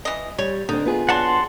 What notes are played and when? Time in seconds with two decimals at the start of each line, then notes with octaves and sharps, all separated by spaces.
0.05 E3 D#5
0.39 G3 C#5
0.69 D3 C4 D#4
0.85 B3 F4 G#4
1.09 F#3 D4 F#4 F#5 A5 C6